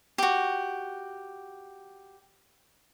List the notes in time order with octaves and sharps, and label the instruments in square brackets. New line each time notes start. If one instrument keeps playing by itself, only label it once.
[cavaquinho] F#4 G4